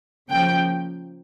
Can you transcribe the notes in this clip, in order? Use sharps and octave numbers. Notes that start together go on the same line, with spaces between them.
C#3 F3 A#3 G5